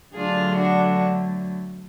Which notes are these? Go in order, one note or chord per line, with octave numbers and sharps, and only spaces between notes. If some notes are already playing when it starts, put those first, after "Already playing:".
D3 F#3 A3 D4 F4 G#4
D4 F#4